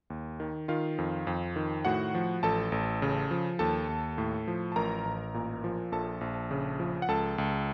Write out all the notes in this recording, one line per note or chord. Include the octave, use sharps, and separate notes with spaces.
D#2
D#3
D#3 F4 F5
F2
F2
D#3
A2 F#4 F#5
F3
A1 A4 A5
A1
C#3
F3
D#2 A4 A5
D#2
A2
F3
A5
A1 A#4 A#5
A1
A#2
F3
A#1 A4 A5
A#1
C#3
F3
F#5
C#2 A4 A5
C#2